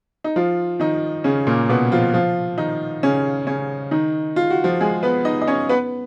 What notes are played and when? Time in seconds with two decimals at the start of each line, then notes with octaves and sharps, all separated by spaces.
0.24 D#4
0.36 F3 F4
0.80 D#3 D#4
1.24 C#3 C#4
1.47 A#2 A#3
1.69 B2 B3
1.92 F3 F4
2.14 F3 F4
2.58 D#3 D#4
3.03 C#3 C#4
3.47 C#3 C#4
3.91 D#3 D#4
4.36 F4
4.50 F#4
4.64 F3 F4
4.81 G#3 G#4
5.03 B3 B4
5.25 D#4 D#5
5.41 D#5
5.47 C#4 C#5
5.69 B3 B4